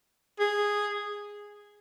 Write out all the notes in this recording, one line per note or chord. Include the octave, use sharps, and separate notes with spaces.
G#4